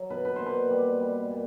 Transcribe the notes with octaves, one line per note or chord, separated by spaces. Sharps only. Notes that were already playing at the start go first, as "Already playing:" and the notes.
Already playing: F#3
B2 B4
B4
A#2 C5
B4
G3
G3
A#2